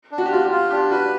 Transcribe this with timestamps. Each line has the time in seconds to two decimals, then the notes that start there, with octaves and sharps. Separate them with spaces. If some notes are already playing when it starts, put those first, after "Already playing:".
0.11 D4
0.18 F#4
0.26 G4
0.31 F4 F#4
0.44 G4
0.51 F4
0.71 D4 G4
0.91 F#4 B4